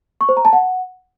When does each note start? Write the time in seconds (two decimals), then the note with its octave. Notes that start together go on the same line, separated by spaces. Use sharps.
0.21 C#6
0.29 C5
0.37 A#5
0.45 A5
0.53 F#5